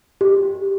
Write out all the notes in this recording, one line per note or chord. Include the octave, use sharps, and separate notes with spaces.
G4